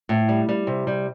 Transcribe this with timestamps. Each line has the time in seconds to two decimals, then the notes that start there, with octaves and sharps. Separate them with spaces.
0.09 A2
0.29 G3
0.49 G3
0.67 C3
0.87 G3